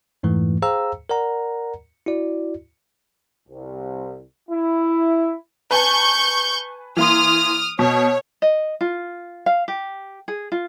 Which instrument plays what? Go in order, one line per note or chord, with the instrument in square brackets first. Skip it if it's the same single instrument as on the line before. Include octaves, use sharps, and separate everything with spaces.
[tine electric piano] F2 G#2 E3 A3
G#4 C5 F5 G5 A#5 E6
A#4 D5 F#5 A#5
E4 F#4 D5
[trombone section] C2
E4
[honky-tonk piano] B4 G#5 A5 [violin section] C#6 G6
[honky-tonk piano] E3 A#3 C6 [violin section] D#6 F6
[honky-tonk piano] B2 [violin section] C#5
[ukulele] D#5
F4
F5
G4
G#4
F4